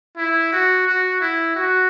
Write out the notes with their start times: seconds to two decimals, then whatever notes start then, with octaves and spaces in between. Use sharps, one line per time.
0.17 E4
0.52 F#4
0.87 F#4
1.21 E4
1.56 F#4